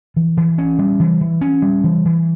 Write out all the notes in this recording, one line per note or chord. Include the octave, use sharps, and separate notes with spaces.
E3
E3
C#4
G3
E3
E3
C#4
G3
E3
E3